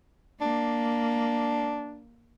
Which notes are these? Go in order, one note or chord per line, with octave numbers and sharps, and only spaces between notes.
A#3 D4